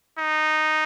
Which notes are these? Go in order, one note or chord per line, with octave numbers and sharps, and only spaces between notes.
D#4